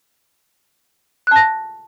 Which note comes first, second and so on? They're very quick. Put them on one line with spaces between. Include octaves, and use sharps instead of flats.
F#6 A5 A#6